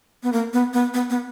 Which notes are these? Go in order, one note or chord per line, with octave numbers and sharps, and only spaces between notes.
B3
A#3
B3
B3
B3
B3